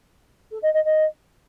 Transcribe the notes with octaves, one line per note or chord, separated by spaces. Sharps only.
A4
D#5
D#5
D#5